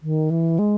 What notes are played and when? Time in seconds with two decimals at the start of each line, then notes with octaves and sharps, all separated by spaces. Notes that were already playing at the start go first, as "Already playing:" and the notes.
0.03 D#3
0.30 E3
0.59 G#3